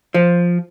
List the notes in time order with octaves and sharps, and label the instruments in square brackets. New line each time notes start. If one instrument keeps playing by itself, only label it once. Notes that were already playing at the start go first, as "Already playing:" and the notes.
[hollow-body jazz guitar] F3